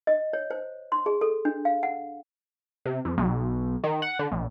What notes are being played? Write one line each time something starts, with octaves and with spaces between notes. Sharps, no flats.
D#5
C#5
C5
C6
G#4
A4
D4
F5
F#5
C3
F2
B1
D#3
F#5
D3
A#1